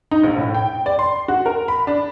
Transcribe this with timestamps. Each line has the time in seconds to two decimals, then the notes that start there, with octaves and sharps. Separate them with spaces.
0.11 D#4
0.23 A#1
0.37 A2
0.54 G5
0.86 D5
0.99 C6
1.28 F#4
1.46 A#4
1.68 B5
1.87 D4